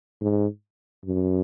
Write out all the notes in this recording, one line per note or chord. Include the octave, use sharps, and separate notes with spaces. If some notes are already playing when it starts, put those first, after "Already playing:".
G#2
F#2